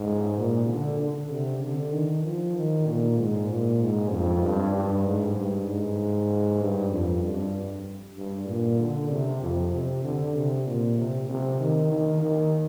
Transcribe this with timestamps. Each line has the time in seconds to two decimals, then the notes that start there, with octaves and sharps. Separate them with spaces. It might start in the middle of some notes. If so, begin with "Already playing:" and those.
Already playing: G#2
0.38 A#2
0.69 D3
1.00 D3
1.31 C3
1.62 D3
1.93 D#3
2.24 F3
2.56 D#3
2.87 A#2
3.18 G#2
3.49 A#2
3.81 G#2
4.12 F2
4.43 G2
4.73 G2
5.05 G#2
5.36 G2
5.67 G#2
6.61 G2
6.92 F2
7.23 G2
8.17 G2
8.48 A#2
8.79 D3
9.11 C3
9.42 F2
9.73 C3
10.04 D3
10.35 C3
10.67 A#2
10.98 C3
11.29 C3
11.60 D#3
11.91 D#3
12.22 D#3